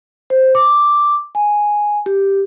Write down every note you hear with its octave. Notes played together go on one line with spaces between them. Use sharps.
C5
D6
G#5
G4